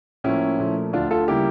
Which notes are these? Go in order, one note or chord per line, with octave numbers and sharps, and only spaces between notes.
A2 F3 A#3 C#4 E4
A#2 F3 A3
D2 D3 A3 D4 F4
F4 A4
C#3 G3 A#3 E4 G4